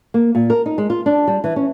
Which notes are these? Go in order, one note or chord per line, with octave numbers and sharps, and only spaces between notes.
A#3
A#2
A#4
D#4
G#3
F4
D4
G3
E3
C#4